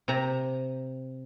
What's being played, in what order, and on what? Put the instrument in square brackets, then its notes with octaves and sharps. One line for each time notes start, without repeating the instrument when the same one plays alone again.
[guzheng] C3 A#5